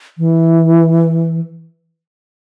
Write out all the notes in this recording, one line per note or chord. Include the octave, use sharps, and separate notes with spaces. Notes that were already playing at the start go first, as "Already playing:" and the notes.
E3